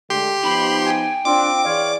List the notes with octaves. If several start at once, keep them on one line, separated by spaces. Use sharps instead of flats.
D3 G#3 A3 G4 C6
F3 B3 D#4 B5
G5 G#5
C4 D4 F4 D6
E3 G#4 C#5 D5 F5